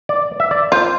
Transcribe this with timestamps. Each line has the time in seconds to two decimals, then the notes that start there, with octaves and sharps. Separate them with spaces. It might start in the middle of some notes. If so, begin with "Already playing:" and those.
0.09 D5
0.40 E5
0.51 D5
0.72 F4 C5